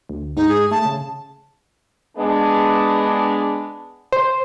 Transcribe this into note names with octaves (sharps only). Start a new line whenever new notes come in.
D2
G#2 D#4
G#4
A3 A5
C#3
G#3 B3 D4
C5